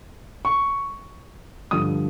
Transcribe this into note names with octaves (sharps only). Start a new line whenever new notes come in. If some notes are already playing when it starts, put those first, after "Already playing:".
C#6
G2 D3 F3 D#6